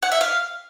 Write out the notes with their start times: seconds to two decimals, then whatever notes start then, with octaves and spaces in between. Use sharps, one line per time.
0.03 F#5
0.12 E5
0.21 F5